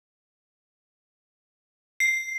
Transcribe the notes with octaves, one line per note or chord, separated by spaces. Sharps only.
C7